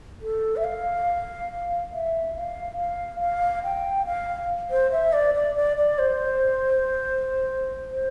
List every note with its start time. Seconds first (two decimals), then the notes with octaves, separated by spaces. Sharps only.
0.22 A4
0.56 E5
0.64 F5
1.93 E5
2.35 F5
2.78 F5
3.21 F5
3.64 G5
4.06 F5
4.71 C5
4.92 E5
5.13 D5
5.34 D5
5.56 D5
5.77 D5
5.99 C5
7.90 C5